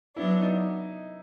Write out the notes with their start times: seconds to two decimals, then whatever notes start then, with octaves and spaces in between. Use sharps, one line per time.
0.16 F#3 B3 D4 E4
0.42 D#4